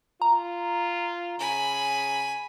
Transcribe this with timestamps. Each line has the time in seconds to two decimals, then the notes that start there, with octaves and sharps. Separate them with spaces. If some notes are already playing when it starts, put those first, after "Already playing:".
0.22 F4 A#5
1.39 C#3 G#5 B5